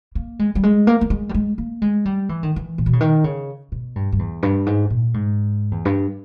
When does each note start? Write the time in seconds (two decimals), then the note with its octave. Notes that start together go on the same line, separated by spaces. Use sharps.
0.15 A#3
0.39 G#3
0.55 G3
0.63 G#3
0.87 A#3
1.01 A#3
1.10 G#3
1.29 G3
1.34 G#3
1.58 A#3
1.82 G#3
2.05 G3
2.29 E3
2.43 D#3
2.56 E3
2.78 A#2
2.86 B2
2.93 C#3
3.01 D#3
3.24 C#3
3.72 B2
3.96 G2
4.12 G2
4.19 E2
4.43 G2
4.66 G#2
4.90 A#2
5.14 G#2
5.71 E2
5.85 G2